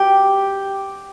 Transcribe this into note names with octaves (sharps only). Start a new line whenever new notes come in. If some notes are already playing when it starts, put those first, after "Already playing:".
Already playing: G4